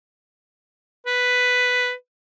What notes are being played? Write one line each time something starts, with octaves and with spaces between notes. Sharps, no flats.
B4